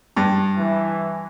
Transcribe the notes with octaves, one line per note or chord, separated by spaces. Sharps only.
G2
E3